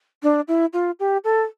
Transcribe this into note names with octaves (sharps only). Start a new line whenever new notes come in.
D4
E4
F4
G4
A4